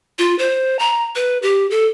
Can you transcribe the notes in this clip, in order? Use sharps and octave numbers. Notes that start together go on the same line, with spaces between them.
F4
C5
A#5
B4
G4
A4